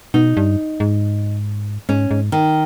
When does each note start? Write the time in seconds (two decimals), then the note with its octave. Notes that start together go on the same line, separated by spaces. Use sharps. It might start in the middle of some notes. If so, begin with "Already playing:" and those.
0.14 B2 D#4
0.37 G2
0.80 G#2
1.89 G#2 C#4
2.11 G#2
2.32 D#3